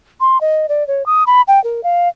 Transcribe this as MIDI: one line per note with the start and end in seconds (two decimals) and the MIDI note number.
0.20 0.40 84
0.41 0.66 75
0.69 0.86 74
0.87 1.05 73
1.06 1.23 87
1.27 1.41 83
1.48 1.62 79
1.64 1.83 70
1.83 2.08 77